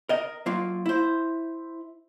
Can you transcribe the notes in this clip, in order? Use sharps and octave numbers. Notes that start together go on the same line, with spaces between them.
A#4 D#5
F#3 A#3 F4
E4 C5